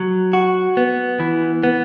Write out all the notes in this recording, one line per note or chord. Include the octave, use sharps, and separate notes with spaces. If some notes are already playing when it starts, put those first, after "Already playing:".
Already playing: F#3
F#4
B3
E3
B3